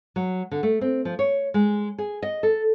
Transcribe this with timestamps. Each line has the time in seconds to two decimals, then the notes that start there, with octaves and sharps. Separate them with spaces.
0.16 F#3
0.51 D3
0.63 A3
0.81 C4
1.05 F3
1.19 C#5
1.54 G#3
1.98 G#4
2.22 D#5
2.43 A4